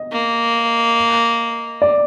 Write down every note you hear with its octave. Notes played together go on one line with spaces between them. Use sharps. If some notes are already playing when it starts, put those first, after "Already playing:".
Already playing: D#5
A#3
D5